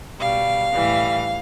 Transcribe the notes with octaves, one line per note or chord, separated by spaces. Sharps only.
B2 G3 F5
A2 E3 G3